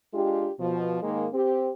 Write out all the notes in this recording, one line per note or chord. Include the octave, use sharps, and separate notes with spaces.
G#3 D4 F4 G4
B2 F3
G#2 D#3 G#3 A#3
C4 G4